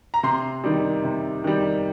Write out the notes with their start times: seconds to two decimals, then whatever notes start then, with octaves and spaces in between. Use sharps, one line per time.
0.14 A#5
0.23 C3 C6
0.64 D#3 G3
1.04 C3
1.44 D#3 G3